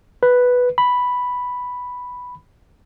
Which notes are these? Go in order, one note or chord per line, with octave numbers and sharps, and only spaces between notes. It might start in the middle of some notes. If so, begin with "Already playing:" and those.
B4
B5